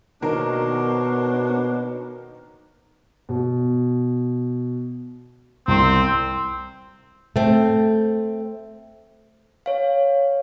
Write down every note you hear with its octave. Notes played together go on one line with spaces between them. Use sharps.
B2 D#3 A#3 D4 A#4 C5 C#5
B2
C2 C4 C6
A3 C4
C#5 F5